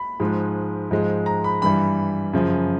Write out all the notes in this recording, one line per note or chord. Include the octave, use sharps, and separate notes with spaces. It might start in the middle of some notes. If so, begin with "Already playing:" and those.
Already playing: B5
G#2 F3 G#3
G#2 F3 G#3
A#5
B5
G2 E3 G3 B5
F#2 C#3 F3